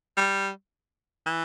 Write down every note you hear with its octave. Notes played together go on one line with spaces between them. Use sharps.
G3
E3